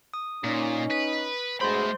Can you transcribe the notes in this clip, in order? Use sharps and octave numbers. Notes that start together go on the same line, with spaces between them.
D#6
A#2 C#4 D#4
B4
B2 D3 G#3 A3 C5 B5 C6